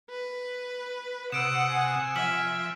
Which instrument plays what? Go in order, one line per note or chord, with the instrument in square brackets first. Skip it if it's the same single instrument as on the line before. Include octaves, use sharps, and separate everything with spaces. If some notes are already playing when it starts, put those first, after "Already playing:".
[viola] B4
[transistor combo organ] C3 D#6 [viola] F#5 [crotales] E6 D7 E7
[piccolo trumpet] G#5
[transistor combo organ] F3 [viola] E5 [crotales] F6 B6 F#7